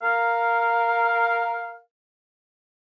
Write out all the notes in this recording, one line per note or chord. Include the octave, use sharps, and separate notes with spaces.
A#4 F5